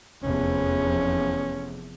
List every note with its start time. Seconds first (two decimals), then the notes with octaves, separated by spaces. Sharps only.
0.23 F1 E2 F3 C#4